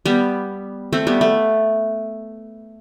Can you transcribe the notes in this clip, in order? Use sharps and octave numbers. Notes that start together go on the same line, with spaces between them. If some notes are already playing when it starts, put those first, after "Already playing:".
G3 B3
A3 C4
G3 B3
A3